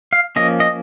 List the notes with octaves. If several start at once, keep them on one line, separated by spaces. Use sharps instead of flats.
F5
F3 A#3 C#4 D#5
D#5